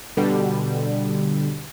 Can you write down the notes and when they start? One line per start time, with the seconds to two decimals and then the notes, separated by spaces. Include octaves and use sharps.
0.17 B2 D3 G3